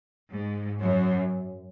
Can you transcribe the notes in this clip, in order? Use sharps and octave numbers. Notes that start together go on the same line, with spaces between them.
G#2
F#2